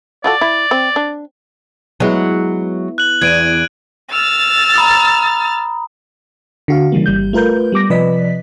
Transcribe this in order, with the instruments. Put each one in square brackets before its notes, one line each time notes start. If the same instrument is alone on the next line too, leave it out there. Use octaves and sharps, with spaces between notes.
[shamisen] F4 F#4 A4 [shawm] D5
[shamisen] E4
C4
D4
[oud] F#3 G#3 [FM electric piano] B3 E4
[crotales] F#6 F#7
[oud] E2 [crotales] G#6 D7 D#7
[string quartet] E6 F6 A6
[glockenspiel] A#5 B5 D#6
[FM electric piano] D3 F#4 F5
C#3 E3 G3 A#3
G1 G3 G6
A3 F4 A#4 B4 G6
G3 B3 D6 A#6
C3 F3 B4 D5 D#5 B6